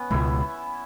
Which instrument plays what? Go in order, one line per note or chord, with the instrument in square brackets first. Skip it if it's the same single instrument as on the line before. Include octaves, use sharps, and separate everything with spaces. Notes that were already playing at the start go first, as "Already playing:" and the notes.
Already playing: [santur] B3 C#4
[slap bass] C#2 B2 G#3 [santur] E4